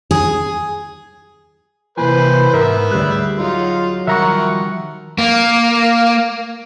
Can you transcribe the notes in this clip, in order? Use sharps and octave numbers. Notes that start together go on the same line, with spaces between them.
G#4
C3 E3 A#3 B4 C5 G#5
G#2 B3 A#4 E5
D2 G3 G4 G#4 F#6
F#3 D#4 F4
D#3 F3 G3 A#4 E5 F#5 A#5 C#6
A#3